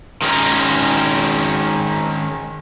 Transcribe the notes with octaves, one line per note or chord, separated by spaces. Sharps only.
D#3 G#3 C#4 A#4